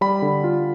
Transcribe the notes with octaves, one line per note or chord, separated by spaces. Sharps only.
G3 B5
D3
F4